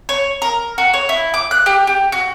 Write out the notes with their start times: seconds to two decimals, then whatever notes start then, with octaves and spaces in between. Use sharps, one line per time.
0.09 C#5
0.42 A#4
0.78 F#4
0.93 C#5
1.09 E4
1.34 D6
1.51 F#6
1.66 G4
1.87 G4
2.12 F#4